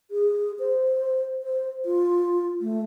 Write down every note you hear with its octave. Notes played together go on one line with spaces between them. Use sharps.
G#4
C5
C5
F4
A3